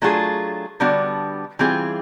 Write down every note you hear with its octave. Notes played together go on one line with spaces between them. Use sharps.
F#3 A3 D4 F4 G#4
D3 G3 B3 D4 F#4
E3 G3 C4 F4 G#4